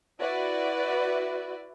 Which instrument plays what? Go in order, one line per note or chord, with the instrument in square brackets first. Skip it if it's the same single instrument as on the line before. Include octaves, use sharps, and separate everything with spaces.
[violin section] E4 F#4 B4 D5 E5